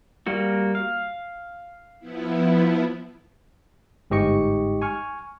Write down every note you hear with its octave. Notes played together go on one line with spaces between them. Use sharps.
G3 A#3 F#4
F5
F3 B3 E4
G1 G#2 G4 D#5 C#6 C#7
G#5 C#6 F6